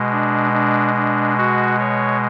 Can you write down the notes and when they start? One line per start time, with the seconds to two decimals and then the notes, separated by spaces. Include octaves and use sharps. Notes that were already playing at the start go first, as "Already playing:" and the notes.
Already playing: B2 G#3
0.11 D4
0.53 D4
0.96 D4
1.38 F#4
1.79 C#5